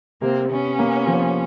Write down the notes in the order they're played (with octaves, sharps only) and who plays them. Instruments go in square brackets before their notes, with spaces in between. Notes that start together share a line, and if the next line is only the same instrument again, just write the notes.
[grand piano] C3 [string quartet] A#3 C4
[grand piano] C3 [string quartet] B3 C#4
[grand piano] A#3
F3